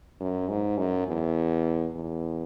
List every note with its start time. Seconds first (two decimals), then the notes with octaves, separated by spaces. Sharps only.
0.21 F#2
0.49 G#2
0.78 F#2
1.08 E2
1.96 E2